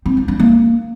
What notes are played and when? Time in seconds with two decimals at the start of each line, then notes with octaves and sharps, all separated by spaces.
0.06 C4
0.17 F4
0.28 D4
0.40 A#3